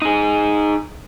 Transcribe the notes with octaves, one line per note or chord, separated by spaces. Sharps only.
D#4 G#4